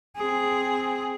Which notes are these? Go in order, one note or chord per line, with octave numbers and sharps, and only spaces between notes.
C4 G#4